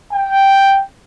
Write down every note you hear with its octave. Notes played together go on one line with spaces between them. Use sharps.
G5